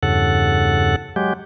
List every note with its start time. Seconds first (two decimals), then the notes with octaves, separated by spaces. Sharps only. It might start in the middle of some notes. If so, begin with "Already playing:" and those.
0.03 E2 G2 C#3 A4 F#5
1.16 F#3 G#3 G4